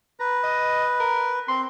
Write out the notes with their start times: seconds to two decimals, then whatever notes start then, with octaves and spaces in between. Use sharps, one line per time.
0.20 B4 A#5
0.43 D#5
1.00 A#4
1.48 C4 C6